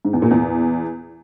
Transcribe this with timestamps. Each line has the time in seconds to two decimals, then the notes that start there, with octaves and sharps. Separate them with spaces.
0.05 G#2
0.13 E2
0.22 A#2
0.31 E2